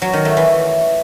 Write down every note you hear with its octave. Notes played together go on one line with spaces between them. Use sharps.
F#3
D#3
A3
E3